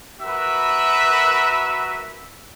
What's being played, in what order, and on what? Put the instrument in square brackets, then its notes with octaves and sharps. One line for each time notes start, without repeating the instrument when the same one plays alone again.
[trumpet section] F#4 A#4 B4 E5